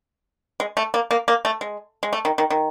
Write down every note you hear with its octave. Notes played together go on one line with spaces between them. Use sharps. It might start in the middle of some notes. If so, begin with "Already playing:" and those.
G#3
A3
A#3
A#3
A#3
A3
G#3
G#3
A3
D#3
D#3
D#3